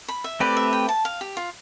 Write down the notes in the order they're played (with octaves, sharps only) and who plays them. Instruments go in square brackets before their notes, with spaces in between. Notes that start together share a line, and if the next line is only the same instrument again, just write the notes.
[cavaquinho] B5
E5
[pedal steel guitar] A3 C4 G4 B4 [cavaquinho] D5
[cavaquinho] E5
G5
A5
F5
G4
F4